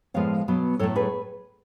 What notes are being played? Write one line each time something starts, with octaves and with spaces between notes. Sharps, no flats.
A2 F3 G#3 B3 C#5 F5
B2 F#3 B3
A2 F#3 A3 A4 C#5
G#4 B4